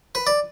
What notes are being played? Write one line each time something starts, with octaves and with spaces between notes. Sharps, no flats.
B4
D5